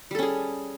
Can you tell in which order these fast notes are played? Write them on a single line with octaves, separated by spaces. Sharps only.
G3 A4 C#4 G#4